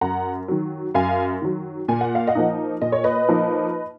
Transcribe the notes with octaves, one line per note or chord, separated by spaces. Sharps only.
F#2 F#5 A#5
D#3 F#3
F#2 F5 G#5
D#3 F#3
A#2 G#5
F#5
F5
D#5 F#5
F3 A#3 D#4
A#2 D#5
C#5
B4 D#5
F3 A#3 D#4